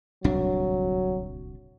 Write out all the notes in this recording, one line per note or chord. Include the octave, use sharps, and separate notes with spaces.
D1 C2 F#3 D4